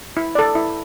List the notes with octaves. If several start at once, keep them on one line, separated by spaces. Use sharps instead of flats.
E4
A4 D5
E4